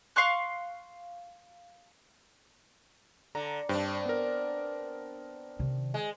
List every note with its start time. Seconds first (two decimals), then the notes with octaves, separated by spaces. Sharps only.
0.16 F5 C6 C#6 F#6
3.35 D3 A#5
3.69 G2 C4 D4
4.05 B3 A#4
5.59 C3 D#3
5.94 G#3